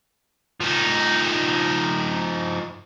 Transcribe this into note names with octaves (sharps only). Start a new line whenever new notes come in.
F3 D#4